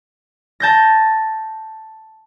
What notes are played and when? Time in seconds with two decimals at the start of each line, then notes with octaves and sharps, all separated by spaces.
0.60 A5 G6 A#6